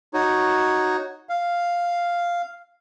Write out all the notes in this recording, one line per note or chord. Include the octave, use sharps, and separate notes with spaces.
D#4 F#4 C#5
F5